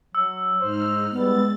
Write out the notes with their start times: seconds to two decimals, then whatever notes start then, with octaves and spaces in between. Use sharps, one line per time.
0.15 F#3 E6
0.61 G#2 D#4 C5 F6
1.12 G3 G#3 B3 A6